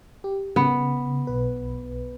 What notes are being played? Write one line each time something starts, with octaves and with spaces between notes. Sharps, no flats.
G4
C#3 B3
B1 B4